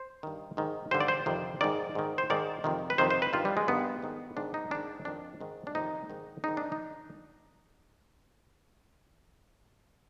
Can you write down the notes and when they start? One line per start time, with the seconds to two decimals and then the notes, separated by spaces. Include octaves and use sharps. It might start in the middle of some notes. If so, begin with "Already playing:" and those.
Already playing: C5
0.23 G2 D#3
0.57 G#2 D#3
0.91 G2 D3 C5
1.00 D5
1.08 C5
1.26 F2 C3 D#3
1.61 G#2 D#3 D5
1.95 G#2 D#3
2.18 C5
2.30 G#2 D#3 D5
2.64 F2 C3 D#3
2.90 B4
2.98 F2 C3 D#3 C5
3.10 C5
3.22 B4
3.33 G2 D#3 F4
3.45 G3
3.57 G#3
3.68 G2 D#3 B3
4.02 G#2 D#3
4.37 G#2 D#3 D4
4.54 D#4
4.71 G#2 D#3 D4
5.05 F2 D#3 D4
5.41 G#2 D#3
5.67 D4
5.75 F2 C3 D#3 D#4
6.10 G#2 D#3
6.44 G#2 D#3 D#4
6.57 D4
6.72 D#4